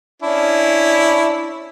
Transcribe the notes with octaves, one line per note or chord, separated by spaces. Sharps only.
C#4 D4 E4